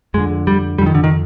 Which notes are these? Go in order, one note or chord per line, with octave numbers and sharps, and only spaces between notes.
F2 D3 G#3
G3
F2 D3 G3
D#3
D3
D#3